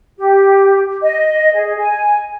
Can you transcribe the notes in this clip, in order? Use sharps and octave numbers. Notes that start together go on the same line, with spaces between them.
G4
D#5
G#4
G#5